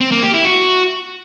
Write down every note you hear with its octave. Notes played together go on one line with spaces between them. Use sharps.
C4
A#3
G4
E4
F#4